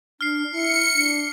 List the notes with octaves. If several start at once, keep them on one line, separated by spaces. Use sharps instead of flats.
D4 F6 C7
E4 C#7
D4